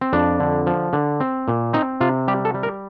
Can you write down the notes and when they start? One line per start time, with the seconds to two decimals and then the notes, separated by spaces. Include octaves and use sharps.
0.01 C4
0.13 F2 D4
0.40 D3
0.67 F3
0.93 D3
1.20 C4
1.48 A#2
1.73 C4 D#4
2.01 C3 F4
2.28 G3 G4
2.45 A4
2.54 G3
2.63 A#4